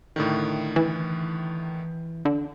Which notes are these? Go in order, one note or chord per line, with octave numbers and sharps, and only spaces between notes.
A2 D3 D#3
E3
D3